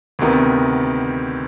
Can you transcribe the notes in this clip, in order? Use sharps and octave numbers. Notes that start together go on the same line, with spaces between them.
D2 C3 D#3 B3